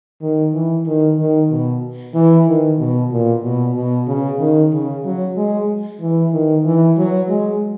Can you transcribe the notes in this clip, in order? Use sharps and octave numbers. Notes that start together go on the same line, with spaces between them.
D#3
E3
D#3
D#3
B2
E3
D#3
B2
A#2
B2
B2
C#3
D#3
C#3
F#3
G#3
E3
D#3
E3
F#3
G#3